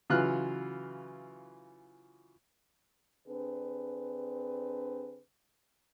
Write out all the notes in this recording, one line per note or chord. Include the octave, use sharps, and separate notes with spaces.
C#3 E3 F#3 F4 F6 F#6
D3 C4 D4 G#4 B4